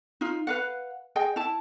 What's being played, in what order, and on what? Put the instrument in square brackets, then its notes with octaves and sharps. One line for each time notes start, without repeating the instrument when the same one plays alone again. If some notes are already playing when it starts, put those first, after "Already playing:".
[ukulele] D#4 F4
B4 F5 F#5
G#4 D#5 G5 G#5
E4 A5